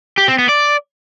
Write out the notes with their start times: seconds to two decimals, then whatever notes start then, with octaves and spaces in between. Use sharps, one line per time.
0.18 G4
0.28 C4
0.38 B3
0.49 D5